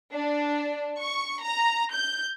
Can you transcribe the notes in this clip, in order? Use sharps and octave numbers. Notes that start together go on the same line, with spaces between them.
D4
C#6
A#5
G6